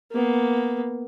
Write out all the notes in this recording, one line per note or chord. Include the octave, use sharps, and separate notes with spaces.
A#3 B3